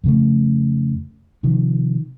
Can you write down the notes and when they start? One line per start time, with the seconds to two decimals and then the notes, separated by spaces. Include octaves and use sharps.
0.04 F2 C#3 A3
1.43 C3 D#3 F3